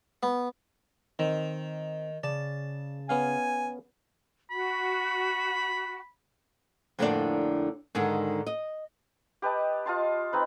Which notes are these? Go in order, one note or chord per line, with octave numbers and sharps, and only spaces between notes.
B3
D#3 C4
C#3 D5 A5
B3 C#4 F5 G#5
F#4 B5
F2 A2 D3 A#3 B3 D4
G#2 D3 D#3 G#3
D#5
G4 B4 D#5 A5
F4 D#5 A5 C6
C4 D#4 B4